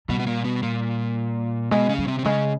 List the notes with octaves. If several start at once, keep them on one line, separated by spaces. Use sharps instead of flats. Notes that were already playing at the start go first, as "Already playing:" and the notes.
B2 G3 B3
B3
A#2 A#3
B2 B3
A#2 A#3
B2 G#3 B3
C#3 C#4
G3
C3 C4
C4
C#3 G#3 C#4